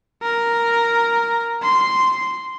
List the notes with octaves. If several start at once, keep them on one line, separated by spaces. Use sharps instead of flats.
A#4
C6